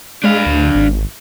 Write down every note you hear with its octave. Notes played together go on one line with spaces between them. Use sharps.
G#3 D4 F5
D2
G#1